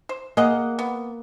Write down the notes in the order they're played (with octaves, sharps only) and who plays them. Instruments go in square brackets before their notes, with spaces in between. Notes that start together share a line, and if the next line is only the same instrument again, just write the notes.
[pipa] C5
[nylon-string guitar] A#3 [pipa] G#4 D#5 F#5
[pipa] B3